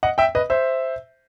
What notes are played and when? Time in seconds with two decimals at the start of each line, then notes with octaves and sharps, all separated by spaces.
0.03 D#5 F#5
0.18 E5 G5
0.35 B4 D#5
0.50 C5 E5